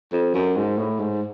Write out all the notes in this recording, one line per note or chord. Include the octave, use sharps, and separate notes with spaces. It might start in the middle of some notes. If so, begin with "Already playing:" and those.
F2
F#2
G#2
A2
G#2